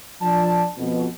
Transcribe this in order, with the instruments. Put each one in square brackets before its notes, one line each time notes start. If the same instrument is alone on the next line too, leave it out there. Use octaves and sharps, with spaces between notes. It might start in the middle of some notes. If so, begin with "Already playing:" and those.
[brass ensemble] F3 D4 D5 A5
F2 B2